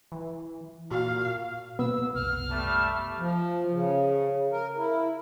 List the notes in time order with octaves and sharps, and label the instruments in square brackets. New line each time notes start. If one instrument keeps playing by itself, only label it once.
[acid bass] E3
[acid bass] A#2 [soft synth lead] F#4 [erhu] F5
[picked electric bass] B2 A#3 [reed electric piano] B3 [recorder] E6
[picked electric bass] F#1 C2 [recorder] F6
[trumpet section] G3 A3 A5
[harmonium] F3
C#3
A#4
E4